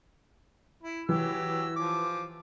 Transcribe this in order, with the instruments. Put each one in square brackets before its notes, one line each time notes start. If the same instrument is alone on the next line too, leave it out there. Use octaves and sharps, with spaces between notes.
[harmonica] E4
[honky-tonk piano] E3 [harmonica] F#3 G4 E6
[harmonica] F3 D6